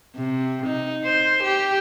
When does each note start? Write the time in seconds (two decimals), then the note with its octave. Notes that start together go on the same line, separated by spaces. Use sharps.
0.16 C3
0.66 D#4
1.05 C5
1.44 G4